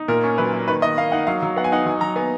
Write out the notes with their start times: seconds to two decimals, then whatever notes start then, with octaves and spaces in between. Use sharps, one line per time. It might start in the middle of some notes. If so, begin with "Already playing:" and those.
Already playing: D#4
0.08 A#2 A#4
0.23 C#4
0.38 F#3 B4
0.54 A#3
0.68 D#3 B4
0.82 D#3 D#5
0.97 A#3 F5
1.12 D#4 F#5
1.27 F#3 F5
1.43 F#3
1.56 B3 F#5
1.64 G#5
1.72 D#4 F#5
1.86 F#3 G#5
2.01 F#3 A#5
2.16 B3 G#5